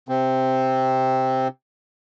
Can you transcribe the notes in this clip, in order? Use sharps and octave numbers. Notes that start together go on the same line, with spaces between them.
C3 C4